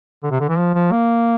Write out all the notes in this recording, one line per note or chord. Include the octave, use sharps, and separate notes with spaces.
D3
C3
D3
E3
F3
F3
A#3